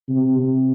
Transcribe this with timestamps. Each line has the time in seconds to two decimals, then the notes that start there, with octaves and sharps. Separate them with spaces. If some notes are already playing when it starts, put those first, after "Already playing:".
0.09 C3
0.39 C3